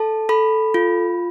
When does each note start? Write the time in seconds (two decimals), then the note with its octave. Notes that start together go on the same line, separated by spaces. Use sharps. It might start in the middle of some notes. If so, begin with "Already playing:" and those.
Already playing: A4 A5
0.29 A4 B5
0.74 F4